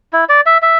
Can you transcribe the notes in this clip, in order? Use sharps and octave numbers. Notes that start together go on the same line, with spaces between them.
E4
D5
E5
E5